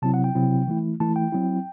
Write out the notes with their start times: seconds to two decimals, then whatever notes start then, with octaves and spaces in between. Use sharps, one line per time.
0.02 C3 F#3 C4 E4 A5
0.14 F#5
0.24 G5
0.35 C3 F#3 C4 E4
0.68 E3 A3 E4
1.00 E3 A3 E4 A5
1.16 G5
1.32 F#3 C4 E4